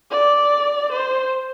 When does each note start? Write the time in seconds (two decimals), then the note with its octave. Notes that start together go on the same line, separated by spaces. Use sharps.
0.11 D5
0.92 C5